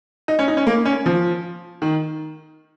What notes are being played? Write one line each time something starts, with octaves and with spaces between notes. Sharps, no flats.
D#4
C#4
D#4
C#4
A#3
C#4
F3
D#3